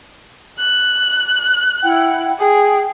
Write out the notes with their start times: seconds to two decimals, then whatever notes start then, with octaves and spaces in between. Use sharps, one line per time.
0.58 F#6
1.82 E4 F#5 G5
2.39 G#4 G5